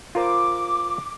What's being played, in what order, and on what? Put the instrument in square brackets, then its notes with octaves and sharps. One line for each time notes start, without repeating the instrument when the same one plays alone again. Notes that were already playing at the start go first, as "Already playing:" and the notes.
[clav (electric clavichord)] F4 A#4 C5 [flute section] D6